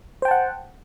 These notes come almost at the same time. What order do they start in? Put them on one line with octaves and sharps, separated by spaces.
C5 G5 A5 F#5